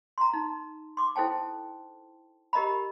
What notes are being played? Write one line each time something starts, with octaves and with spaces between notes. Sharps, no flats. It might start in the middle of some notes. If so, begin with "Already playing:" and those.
A#5 C6
D#4
C6 D6
E4 A4 C5 G5 A5
G4 A#4 D#5 A#5 B5